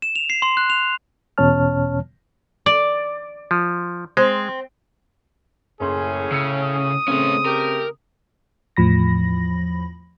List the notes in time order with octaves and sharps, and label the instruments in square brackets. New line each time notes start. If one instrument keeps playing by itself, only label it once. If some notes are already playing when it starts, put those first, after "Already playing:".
[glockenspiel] E7
F7
C7
C6
F#6
F7
[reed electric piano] E2 B2 C#4 C#5 A5 F6
[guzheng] D5
[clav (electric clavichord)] F3
[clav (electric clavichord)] G#3 [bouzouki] C4
[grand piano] F#1 C6 [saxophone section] A2 C#4 [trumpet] G#4
[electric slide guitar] C#3 [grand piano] E6 C#7
[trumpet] D#6
[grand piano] C#3 C4 [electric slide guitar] A3 C#4
[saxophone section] A3 G4 [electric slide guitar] A#4
[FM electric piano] E2 A2 F3 B5 A#6